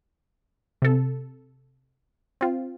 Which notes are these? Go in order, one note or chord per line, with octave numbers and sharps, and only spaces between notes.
C3 A4
C4 F4